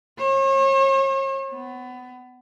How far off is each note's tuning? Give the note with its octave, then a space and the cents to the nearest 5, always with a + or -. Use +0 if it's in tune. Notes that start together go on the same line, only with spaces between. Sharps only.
C#5 -40
B3 +25